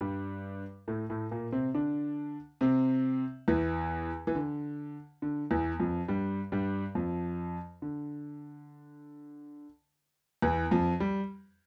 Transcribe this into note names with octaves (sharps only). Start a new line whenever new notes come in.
G2 G3
A2 A3
A2 A3
A#2 A#3
C3 C4
D3 D4
C3 C4
E2 E3
E3
D3
D3
E2 E3
F2 F3
G2 G3
G2 G3
F2 F3
D3
E2 E3
F2 F3
G3